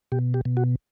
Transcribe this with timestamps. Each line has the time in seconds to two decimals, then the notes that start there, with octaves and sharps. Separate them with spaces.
0.12 B2 G4
0.34 G4
0.45 B2
0.57 F#4